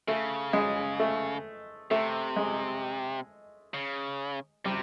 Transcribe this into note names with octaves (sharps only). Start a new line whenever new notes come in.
C#3 A3
G#3
A3
C3 A3
G#3
C#3
C3 G3